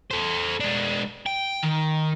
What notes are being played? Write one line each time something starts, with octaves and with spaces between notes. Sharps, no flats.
A4 C5
G#3 D4
G5
D#3